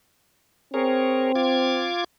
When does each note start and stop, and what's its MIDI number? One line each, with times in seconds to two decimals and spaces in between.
0.74 1.91 60
0.74 1.32 68
0.74 1.32 70
0.74 1.32 73
1.35 2.04 65
1.35 2.04 86
1.35 2.04 92